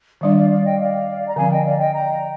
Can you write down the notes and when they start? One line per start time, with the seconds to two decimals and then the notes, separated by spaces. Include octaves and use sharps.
0.21 D#3 G3 D4 D5 F5
0.36 D5 F5
0.50 D5 F5
0.65 D#5 G5
0.79 D5 F5
1.26 A#5
1.36 D3 F3 C4 F5 G#5
1.50 D#5 G5
1.64 D5 F5
1.79 D#5 G5
1.93 G5 A#5